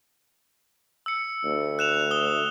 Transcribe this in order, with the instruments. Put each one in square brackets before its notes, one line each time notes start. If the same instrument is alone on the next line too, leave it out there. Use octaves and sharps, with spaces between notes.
[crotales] E6 C#7
[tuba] D2
[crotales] F#6 E7 F7
D#6 G7